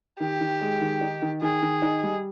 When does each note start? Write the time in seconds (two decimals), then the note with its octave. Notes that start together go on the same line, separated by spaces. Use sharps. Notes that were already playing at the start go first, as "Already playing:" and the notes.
0.20 D#3 G4
0.40 D#3
0.61 G#3
0.81 D#3
1.01 D#4
1.22 D#3
1.42 D#3 G#4
1.62 D#3
1.82 D#4
2.03 G3